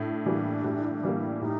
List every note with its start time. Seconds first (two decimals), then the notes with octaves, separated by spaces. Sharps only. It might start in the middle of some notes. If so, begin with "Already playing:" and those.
Already playing: A2 D4
0.26 E3 G3 A#3
0.64 A2
1.03 E3 G3 A#3
1.41 A2 D#4